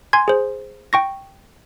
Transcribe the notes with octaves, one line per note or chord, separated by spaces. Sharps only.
G#5 C6 G#6
G#4 C5
G5 C#6 A#6